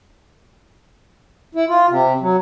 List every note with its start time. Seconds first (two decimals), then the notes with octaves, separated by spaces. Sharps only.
1.55 E4
1.68 F4
1.90 C3
2.21 F#3